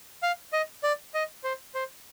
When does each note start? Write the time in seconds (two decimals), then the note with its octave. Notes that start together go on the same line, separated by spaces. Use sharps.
0.23 F5
0.53 D#5
0.83 D5
1.14 D#5
1.44 C5
1.75 C5